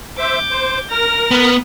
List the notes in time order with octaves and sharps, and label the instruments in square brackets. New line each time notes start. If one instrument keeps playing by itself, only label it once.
[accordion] C5 E5 [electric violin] D6 G6
[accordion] C5
[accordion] A#4 [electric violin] F6 A#6
[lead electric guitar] B3